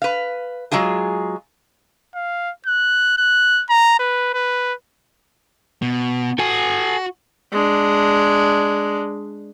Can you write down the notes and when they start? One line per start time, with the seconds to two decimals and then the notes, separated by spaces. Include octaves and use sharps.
0.02 B4 F5
0.72 F#3 G#3 F4 G#4
2.15 F5
2.66 F#6
3.18 F#6
3.70 A#5
3.99 B4
4.34 B4
5.82 B2
6.39 F#4 A4 G#5
7.52 G#3 D4